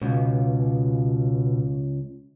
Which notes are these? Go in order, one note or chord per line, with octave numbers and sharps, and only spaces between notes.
C#2 B2